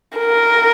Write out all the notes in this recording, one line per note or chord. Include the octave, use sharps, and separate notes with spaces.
A#4